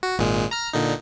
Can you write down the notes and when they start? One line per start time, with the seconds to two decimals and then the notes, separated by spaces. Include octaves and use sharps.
0.03 F#4
0.19 G#1 A#2 G#3
0.51 A#5 F6
0.73 A#2 D3 D#4